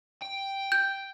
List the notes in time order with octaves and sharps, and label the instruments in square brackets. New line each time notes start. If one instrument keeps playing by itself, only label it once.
[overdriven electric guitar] G5
[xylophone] G6